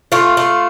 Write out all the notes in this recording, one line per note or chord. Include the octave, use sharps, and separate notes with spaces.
A3 F4
A3